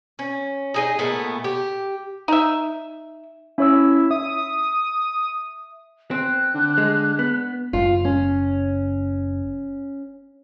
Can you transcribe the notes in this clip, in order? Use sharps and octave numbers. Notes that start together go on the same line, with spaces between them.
C#4
D#4 G#4 D#5
A#2 A3 B3
G4
D#4 E5
C#4 E4 C#5 E6
E5 D#6
C4 F#6
D3
G#3
B3
F#1 F4
C#4